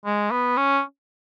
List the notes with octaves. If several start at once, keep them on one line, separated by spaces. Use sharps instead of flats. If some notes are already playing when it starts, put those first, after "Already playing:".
G#3
B3
C#4